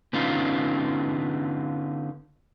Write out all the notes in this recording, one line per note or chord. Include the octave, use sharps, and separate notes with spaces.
D3 B3 C#4 D#4 F4